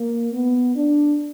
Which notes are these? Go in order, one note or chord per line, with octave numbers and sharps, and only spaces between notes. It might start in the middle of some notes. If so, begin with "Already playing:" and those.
Already playing: A#3
B3
D4